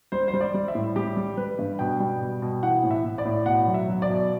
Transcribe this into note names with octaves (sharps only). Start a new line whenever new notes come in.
G3 C5
C5
G3
D5
G3
E5
A2
G3 G4
G3
G3 B4
G2
B2 G5
G3
B2
B2
E3 F#5
A2
E5
A2
D5
A2
B2 F#5
F#3
E5
F#3
D5
B2